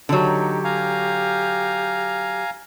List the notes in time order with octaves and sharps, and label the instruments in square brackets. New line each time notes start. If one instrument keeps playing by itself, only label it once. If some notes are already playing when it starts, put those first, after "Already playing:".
[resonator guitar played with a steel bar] D3 F#3 [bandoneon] D#4 [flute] G4
[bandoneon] F5 G#5 A#5